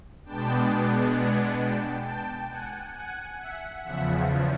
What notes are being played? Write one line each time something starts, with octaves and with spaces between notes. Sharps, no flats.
B2 G#3 B3 D4 G5 A5
F#5 G#5
G5 A5
G5 A5
F#5 G#5
F#5 G#5
E5 F#5
E2 C#3 F3 E5 F#5